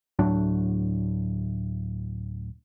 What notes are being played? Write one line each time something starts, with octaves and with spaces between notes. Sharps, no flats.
D2 A2 F#3 D4